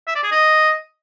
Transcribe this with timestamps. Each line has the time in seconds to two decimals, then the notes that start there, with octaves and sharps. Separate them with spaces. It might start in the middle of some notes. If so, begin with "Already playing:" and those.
0.07 E5
0.16 D5
0.24 G#4
0.32 D#5